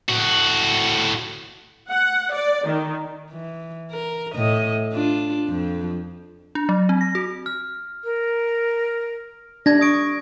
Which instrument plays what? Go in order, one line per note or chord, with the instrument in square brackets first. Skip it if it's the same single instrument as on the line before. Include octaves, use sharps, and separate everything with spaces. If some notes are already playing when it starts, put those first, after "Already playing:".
[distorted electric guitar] A2 F#4
[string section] F#5
D5
D#3
[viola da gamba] E3
A#4
A2 D#5
D4 F4
F2 F3
[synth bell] D4
F#3
C4
A#6
F#4
[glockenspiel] F6
[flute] A#4
[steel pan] D4 [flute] D5 [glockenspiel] G#6 A#6
[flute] C#6 [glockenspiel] D#6 G#6 D7